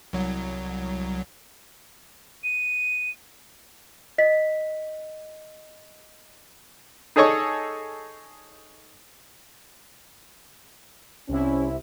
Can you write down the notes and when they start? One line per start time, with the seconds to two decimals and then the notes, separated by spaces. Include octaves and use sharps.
0.13 C2 F#3
2.44 D#7
4.18 D#5 B6
7.16 D#4 G#4 A4 C#5 D#5 C#6
11.29 C2 C3 G3 C4 C#4 E4